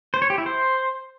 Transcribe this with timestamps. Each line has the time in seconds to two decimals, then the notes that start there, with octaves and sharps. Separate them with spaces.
0.14 C5
0.22 C#5
0.30 G4
0.38 E4
0.46 C5